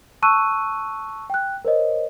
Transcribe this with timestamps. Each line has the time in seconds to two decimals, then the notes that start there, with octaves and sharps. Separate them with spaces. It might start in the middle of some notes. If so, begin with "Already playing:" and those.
0.22 A5 C#6 E6 F#6 D#7
1.30 G5 F#6
1.65 A#4 C5 C#5 D#5